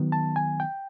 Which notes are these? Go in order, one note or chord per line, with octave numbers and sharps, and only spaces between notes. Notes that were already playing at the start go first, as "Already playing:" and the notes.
Already playing: D#3 F#3 B3
A5
G#5
G5